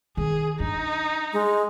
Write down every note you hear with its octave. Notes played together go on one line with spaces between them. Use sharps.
D#3 G#4
F#3 D4 D#4
G#3